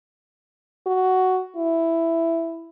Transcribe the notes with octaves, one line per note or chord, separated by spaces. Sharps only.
F#4
E4